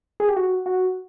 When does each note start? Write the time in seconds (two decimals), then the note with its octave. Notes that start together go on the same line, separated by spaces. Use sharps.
0.20 G#4
0.29 G4
0.36 F#4
0.66 F#4